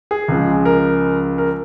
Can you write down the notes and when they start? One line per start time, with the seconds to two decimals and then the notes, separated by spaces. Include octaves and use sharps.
0.11 G#4
0.28 C#2 C#3 F3 G#3
0.65 A#4
1.38 A#4